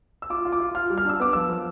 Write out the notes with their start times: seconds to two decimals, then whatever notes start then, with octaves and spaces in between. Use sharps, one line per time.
0.22 E6
0.30 F4 D6
0.45 F4
0.52 D6
0.60 F4
0.75 F4 F6
0.90 G3
0.98 F6
1.05 D4 E6
1.20 B3 D6
1.33 F3 E6
1.50 F3